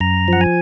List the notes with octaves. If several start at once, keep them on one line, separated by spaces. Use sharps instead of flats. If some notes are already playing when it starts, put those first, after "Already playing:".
F#2 A#5
F3 F#5
G#5